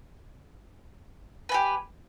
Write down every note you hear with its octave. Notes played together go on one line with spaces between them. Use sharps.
G4 B4 G#5